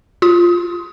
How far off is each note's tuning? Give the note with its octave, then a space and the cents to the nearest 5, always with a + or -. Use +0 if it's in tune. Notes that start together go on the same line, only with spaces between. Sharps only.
F4 +0 D#6 +25